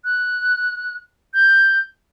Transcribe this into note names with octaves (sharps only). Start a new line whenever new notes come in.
F#6
G6